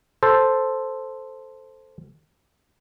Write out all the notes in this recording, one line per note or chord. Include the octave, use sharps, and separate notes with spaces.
A4 C5